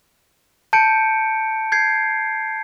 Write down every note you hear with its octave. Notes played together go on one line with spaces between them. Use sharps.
A5 G6 C#7 D7
G6 G#6 C7